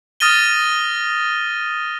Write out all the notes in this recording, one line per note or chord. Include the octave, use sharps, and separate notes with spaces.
D#6 F6 A6 A#6 D#7 G7